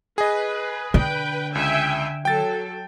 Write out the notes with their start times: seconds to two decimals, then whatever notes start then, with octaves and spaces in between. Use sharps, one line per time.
0.18 G#4 B4 D#5
0.94 D3 B4 G5
1.55 C#2 E5 G5 G#5
2.25 F#3 A4 G5 A6